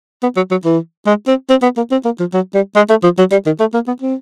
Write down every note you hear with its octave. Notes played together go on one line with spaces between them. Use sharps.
B3
F#3
F#3
E3
G#3
C4
C4
B3
A#3
C4
A#3
F3
F#3
G3
G#3
A3
F3
F#3
G3
D#3
A3
A#3
B3
C4